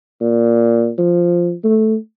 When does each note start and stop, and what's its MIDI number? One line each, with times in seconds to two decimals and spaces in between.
0.21 0.90 46
0.98 1.53 53
1.64 1.96 57